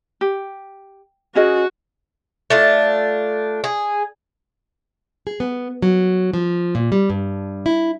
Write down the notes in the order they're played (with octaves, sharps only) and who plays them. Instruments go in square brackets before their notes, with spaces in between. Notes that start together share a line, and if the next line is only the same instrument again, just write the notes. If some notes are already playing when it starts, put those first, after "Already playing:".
[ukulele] G4
[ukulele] C#4 G#4 D#5 [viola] F#4
[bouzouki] A3 D4 F4
G#4
[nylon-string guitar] G#4
B3
F#3
F3
A#2
G3
G2
E4